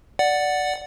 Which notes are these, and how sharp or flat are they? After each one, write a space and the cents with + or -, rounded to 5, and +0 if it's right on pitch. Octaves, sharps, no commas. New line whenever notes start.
D5 +0 F#5 +0